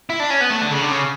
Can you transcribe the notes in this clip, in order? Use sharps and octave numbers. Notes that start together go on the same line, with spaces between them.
E4
D4
C#4
B3
A3
D3
C#3
D3
C#3